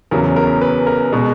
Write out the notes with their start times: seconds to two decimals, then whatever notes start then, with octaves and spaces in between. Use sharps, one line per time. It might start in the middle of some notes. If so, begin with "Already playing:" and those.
0.11 E2 C#3 F#3 A#4
0.36 A#4
0.61 B4
0.87 A#4
1.12 B2 G#3